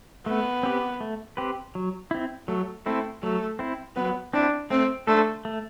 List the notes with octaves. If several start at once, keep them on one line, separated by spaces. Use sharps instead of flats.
A3 B3
C4 G4 B4
A3
C4 G4 B4
F#3
C4 E4
F#3 A3
A3 C4 E4
F#3 A3
C4 E4
F#3 B3
C4 D4 E4
A3 C4
A3 D4 A4 C5
A3